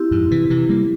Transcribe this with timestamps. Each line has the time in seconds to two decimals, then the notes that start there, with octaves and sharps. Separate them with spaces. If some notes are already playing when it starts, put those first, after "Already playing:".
Already playing: C4 E4 G4
0.11 F2 G#2
0.31 C3 E3
0.50 C3 E3
0.69 G3 A#3